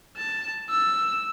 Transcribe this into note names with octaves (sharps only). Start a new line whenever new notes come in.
A5
E6